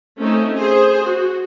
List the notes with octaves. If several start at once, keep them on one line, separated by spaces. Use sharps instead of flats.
A3 C4 C#4 D#4
G#4 C5
F#4